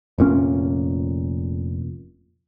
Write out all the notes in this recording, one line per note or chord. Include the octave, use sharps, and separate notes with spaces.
F1 A#2 C#4